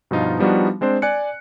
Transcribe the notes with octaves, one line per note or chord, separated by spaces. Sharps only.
G2 B2 F3 D#4 F4
F3 G3 B3 D4 D#4 F#4
G#3 C4 D4 C5
D5 G#5 F#6 C#7